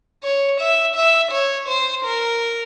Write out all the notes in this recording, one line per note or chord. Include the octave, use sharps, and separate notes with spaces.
C#5
E5
E5
C#5
C5
A#4